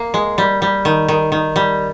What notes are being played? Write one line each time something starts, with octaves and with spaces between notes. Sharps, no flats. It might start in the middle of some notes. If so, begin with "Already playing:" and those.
Already playing: A#3
G#3
G3
G3
D#3
D#3
D#3
G3